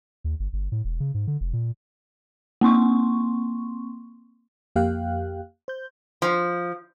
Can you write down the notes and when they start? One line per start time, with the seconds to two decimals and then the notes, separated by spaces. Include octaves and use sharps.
0.24 D#2
0.40 G1
0.53 G1
0.72 A2
0.85 E1
1.00 C#3
1.14 G#2
1.27 D3
1.41 F1
1.53 A#2
2.61 A#3 C4 C6 C#6
4.76 F2 A#3 G4 F5 G5 F#6
5.68 C5 G6
6.22 F3